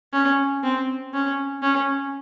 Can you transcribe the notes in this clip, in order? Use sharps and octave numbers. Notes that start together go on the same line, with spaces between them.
C#4
C4
C#4
C#4